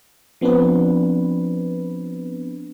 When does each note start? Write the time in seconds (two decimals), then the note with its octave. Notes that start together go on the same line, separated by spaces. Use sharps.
0.41 F3 B3 C4 D4 B4